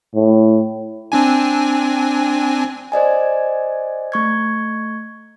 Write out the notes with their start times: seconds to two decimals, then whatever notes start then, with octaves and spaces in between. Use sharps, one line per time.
0.15 A2
1.12 C4 D4 G#5
2.92 C5 D5 D#5 G#5
4.12 A3 C#6 G#6